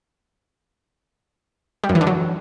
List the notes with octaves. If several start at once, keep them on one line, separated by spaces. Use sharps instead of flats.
G3
F#2
E3
D3
F#3